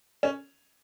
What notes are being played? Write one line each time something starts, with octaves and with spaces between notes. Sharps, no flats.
C#4